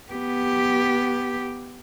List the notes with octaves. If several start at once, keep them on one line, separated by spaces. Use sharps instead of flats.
B3 G4